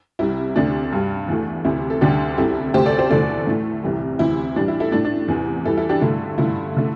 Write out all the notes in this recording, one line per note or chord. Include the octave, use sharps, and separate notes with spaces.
C2 C3 G3 E4
D2 C3 A3 D4
G2 G3
E2 E3 A3
D2 C3 E3 E4
A4
D2 D3 G3 D4 G4
C2 C3 G3 E4 A4
D2 C3 A3 G4 C5
A4 D5
G4 C5
E2 D3 A3 A4 D5
A2 A3
C2 C3 E3 G3
D2 C3 E3 E4
A2 E3 G3 D4
E4
E4 A4
A2 A3 D4
D4
E2 C3 E3
E2 E3 G3 E4 A4
E4 A4
D4 G4
G2 D3 A3 E4
G2 D3 A3 E4
D3 A3